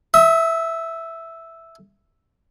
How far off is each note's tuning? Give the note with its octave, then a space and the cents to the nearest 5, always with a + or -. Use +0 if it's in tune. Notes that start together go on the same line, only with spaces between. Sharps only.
E5 +0 D#6 +45